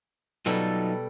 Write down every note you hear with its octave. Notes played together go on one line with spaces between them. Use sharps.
B2 F#3 G3 D#4 F4 A4